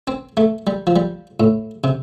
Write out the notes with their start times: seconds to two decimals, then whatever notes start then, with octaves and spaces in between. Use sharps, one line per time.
0.08 C4
0.37 A3
0.67 G3
0.87 F3
0.96 G3
1.40 A2
1.84 C3